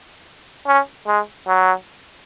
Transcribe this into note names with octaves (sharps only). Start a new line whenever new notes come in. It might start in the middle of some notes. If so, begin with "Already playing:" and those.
C#4
G#3
F#3